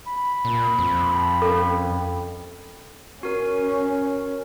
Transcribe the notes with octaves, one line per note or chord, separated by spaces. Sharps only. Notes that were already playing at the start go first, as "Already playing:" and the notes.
B5
A#2
F2
C#4 A4
C#4 F#4 A#4